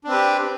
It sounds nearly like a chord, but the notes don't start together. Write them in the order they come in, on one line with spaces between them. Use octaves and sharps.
D4 C4 B4 G4